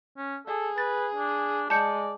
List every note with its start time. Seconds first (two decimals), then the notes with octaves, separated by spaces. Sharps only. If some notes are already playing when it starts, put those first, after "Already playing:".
0.18 C#4
0.47 G#4 A4
0.78 B4 A6
1.15 D4
1.70 G#3 D5 A5 G6 C#7